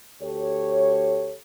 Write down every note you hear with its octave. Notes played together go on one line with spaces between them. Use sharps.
D2 G4 A4 C#5